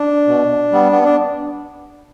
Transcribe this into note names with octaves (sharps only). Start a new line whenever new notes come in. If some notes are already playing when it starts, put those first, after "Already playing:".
Already playing: D4
B2
G3 B3
B3
D4